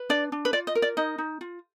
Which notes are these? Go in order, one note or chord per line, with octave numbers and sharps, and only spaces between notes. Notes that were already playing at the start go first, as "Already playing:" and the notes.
Already playing: B4
D4 D5
D4
B4
F4 D5
D#5
A#4
D5
D#4 D#5
D#4
F4